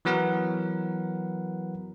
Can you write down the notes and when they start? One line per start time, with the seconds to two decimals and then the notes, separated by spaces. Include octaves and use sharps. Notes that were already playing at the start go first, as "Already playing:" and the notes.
0.05 E3 F#3 B3 A#4 F#5 B5